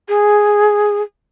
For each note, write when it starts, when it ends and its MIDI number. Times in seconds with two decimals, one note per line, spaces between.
0.09 1.02 68